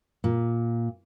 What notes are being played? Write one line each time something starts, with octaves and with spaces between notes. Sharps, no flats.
A#2